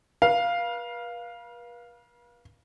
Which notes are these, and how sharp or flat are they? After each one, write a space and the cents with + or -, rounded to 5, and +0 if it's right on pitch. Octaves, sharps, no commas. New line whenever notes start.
B4 -40 F5 +0